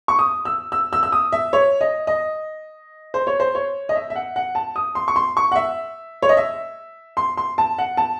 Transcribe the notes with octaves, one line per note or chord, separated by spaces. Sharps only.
C#6
D#6
E6
E6
E6
E6
D#6
E5
C#5
D#5
D#5
C5
C#5
C5
C#5
D#5
E5
E5
F#5
F#5
A5
D#6
C6
C#6
C6
C#6
F#5
E5
C#5
D#5
E5
C6
C6
A5
F#5
A5